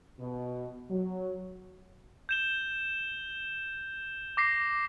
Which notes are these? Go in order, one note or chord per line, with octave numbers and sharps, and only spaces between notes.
B2
F#3
G6 E7 G7
D6 A#6 C7